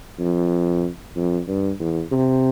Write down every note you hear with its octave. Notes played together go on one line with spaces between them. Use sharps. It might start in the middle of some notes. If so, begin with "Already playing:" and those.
F2
F2
G2
E2
C3